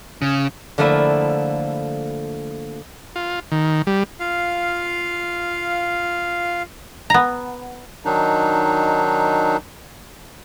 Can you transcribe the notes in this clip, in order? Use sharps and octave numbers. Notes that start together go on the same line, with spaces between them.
C#3
D3 F3 A3 A#3 E4
F4
D#3
G3
F4 F5
B3 A#5
D#3 F#3 D4 D#4